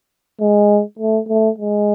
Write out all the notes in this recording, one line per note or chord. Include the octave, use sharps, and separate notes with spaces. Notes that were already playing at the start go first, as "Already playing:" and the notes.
G#3
A3
A3
G#3